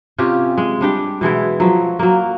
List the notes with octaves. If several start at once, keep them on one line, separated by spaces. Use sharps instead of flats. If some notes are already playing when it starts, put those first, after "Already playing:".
C3 C#4 F4 G4
G#3
G3 D4 G4
B2 E3 G#3 E4
F3 F#3
F#3 A#3